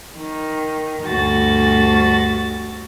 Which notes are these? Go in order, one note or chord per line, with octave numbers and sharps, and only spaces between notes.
D#3
D2 G2 F#4 A6